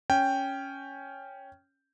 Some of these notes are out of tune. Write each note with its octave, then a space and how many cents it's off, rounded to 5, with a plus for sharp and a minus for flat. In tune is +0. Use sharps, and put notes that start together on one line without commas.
C#4 +0 G5 +0